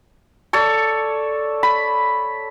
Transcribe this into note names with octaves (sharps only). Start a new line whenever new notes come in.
A4 C#5 D5
B5